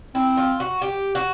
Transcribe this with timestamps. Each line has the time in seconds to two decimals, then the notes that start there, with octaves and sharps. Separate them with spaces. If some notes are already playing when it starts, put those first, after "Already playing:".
0.15 C4 E4
0.37 F4
0.60 F#4
0.82 G4
1.15 F#4